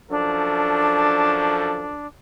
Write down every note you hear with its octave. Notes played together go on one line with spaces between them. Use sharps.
F#2 F3 D4 A4